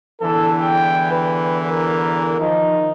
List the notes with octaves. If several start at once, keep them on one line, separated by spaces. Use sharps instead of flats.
E2 D3 E3 A4
G5
B4
A#4
D#3 F3 D#4